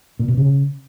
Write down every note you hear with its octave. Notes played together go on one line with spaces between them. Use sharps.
A#2
B2
C#3